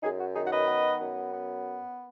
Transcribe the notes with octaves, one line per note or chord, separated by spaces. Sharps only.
F#2 D#4 G#4
F#4
D#3 D#4 G#4
F#5
B4 D#5
B3
F#2
B3